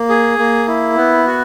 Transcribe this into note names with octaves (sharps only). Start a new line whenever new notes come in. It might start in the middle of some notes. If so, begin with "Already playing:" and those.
Already playing: A#3
G#4
A#3
E4
B3
F#4